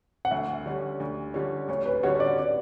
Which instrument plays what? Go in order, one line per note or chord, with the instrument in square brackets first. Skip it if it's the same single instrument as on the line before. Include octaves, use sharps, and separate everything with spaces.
[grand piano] F#5
[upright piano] D2 [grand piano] E5
[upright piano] D3 G3 C#4
D2
D3 G3 C#4
[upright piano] D2 [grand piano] C#5
[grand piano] B4
[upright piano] D3 G3 C#4 F#4 [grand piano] C#5
[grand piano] D5
D5